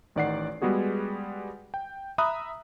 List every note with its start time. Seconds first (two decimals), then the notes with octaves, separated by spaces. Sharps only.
0.16 A1 D#3 D5 F#5 C7
0.62 G3 G#3 B3 F#4 G#4
1.74 G5
2.18 E5 A#5 B5 D#6 F#6